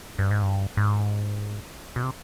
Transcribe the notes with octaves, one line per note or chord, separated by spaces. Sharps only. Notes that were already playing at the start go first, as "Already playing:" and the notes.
G2
G#2
G2
G#2
B2
C3